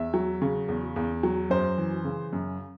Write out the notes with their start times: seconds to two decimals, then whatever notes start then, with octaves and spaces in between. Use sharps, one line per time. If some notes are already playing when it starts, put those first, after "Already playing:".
Already playing: E2 E5
0.14 F#3
0.42 C#3
0.68 E2
0.96 E2
1.23 F#3
1.50 F#2 C5
1.78 E3
2.05 C#3
2.33 F#2